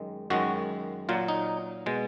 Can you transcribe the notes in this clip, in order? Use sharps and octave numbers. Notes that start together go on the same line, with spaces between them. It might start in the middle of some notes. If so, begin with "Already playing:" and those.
Already playing: F#2 D#3 G#3
F#2 D#3 G#3 F#4
A#2 F#3 F4
D#4
B2 G#3